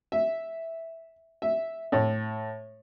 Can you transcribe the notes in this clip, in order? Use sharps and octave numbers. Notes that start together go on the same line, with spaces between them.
E5
E5
A2